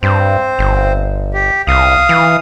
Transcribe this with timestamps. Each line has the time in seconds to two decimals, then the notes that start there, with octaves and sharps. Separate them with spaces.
0.03 G2 C4 C5
0.59 G1
1.33 G4
1.67 C2 F5 D#6
2.09 E3